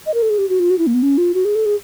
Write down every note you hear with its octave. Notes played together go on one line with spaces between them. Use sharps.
D#5
A#4
A4
G#4
G4
F#4
F4
F#4
E4
A#3
B3
C#4
F4
F#4
G#4
A4
G#4